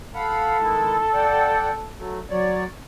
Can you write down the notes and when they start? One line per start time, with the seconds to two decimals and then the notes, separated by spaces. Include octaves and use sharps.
0.15 A4 F5 F#5 B5
0.62 D#3 G#3 E4
1.13 D5 F#5 G5
1.99 F#3 A3
2.30 F#3 C#5 D5